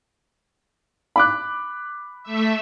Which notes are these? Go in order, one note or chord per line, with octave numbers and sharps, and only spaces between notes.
B5 D6 F#6
A3 E5